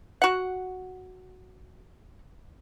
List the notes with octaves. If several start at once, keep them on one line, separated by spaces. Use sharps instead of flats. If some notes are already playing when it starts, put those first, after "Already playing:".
F#4 F#5